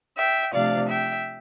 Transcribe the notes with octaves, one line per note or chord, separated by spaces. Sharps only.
E5 G5
C3 F3 A3 D4 D5 F5
E5 G5